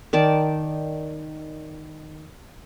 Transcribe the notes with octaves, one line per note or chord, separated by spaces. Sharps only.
D#3 D5 A5